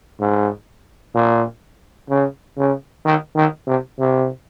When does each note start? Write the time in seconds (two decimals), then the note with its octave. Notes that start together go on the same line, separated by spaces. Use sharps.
0.20 G#2
1.15 A#2
2.09 C#3
2.57 C#3
3.05 D#3
3.36 D#3
3.67 C3
3.99 C3